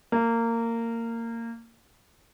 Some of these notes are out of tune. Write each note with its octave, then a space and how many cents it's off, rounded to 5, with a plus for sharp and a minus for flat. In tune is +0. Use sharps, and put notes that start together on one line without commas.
A#3 -20